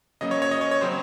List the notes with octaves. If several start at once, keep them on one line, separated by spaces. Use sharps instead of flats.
C#3 F#3 A#3 C#4 D#5
C#5
C#5
D#5
C#5
C#5
C#3 F#3 C4 C5